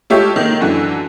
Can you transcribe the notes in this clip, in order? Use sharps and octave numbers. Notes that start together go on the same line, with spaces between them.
G#3 A3 F4 G4 C#5 E5
D#3 A#3
F#2 D3 E3